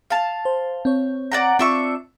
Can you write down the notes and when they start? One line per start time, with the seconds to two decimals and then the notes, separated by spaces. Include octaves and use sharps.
0.10 F5 A5
0.45 C5
0.85 C4 C#5
1.32 D5 F#5 A#5
1.59 C4 D4 F4 E5 C#6 E6